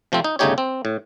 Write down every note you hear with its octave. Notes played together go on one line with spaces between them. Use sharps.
C3 F3 A3 C4
D#4
G1 C#3 A3 D#4 G4 C#5
C4
A2